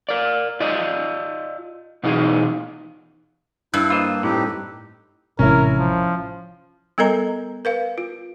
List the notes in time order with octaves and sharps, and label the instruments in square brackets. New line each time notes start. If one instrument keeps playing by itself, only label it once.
[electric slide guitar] A#4 D5
F4 D5 D#5
B2 E3 D#4 F4 G#4
[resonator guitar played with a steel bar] G2 [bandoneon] E4 [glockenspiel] E6 F#6
[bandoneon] A#3 [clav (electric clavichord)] F4 C5 D#5
[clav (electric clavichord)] A2 [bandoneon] C4 D#4 G4
[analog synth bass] A1 [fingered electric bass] C3 E3 G#3 [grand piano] C#4 E4 [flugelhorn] A#4
[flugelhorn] F3
[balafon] G3 B3 A4 A#4 D#5 A#5
A#4 B4 F5
F4